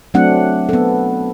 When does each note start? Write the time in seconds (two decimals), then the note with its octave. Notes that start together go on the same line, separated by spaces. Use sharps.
0.14 F#3 A3 C4 D4 F#5
0.69 B3 A4